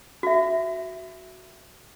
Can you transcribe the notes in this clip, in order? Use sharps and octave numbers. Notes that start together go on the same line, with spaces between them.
F#4 E5